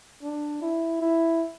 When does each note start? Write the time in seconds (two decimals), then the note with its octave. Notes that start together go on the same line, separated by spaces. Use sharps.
0.23 D4
0.62 E4
1.01 E4